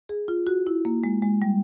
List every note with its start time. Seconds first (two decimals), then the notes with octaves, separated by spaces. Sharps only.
0.09 G#4
0.28 F4
0.47 F#4
0.67 E4
0.85 A#3
1.04 G#3
1.23 G#3
1.42 G3